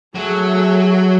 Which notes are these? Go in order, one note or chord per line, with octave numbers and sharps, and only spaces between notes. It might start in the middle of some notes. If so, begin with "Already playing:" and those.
F#3 A3 G#4